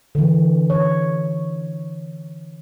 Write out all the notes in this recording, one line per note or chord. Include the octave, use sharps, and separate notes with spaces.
D3 E3
C#5